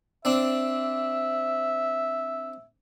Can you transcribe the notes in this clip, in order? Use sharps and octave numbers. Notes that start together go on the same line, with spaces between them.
C4 D4 E5